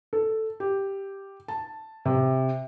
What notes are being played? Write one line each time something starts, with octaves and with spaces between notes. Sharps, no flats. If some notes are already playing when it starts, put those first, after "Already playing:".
A4
G4
A5
C3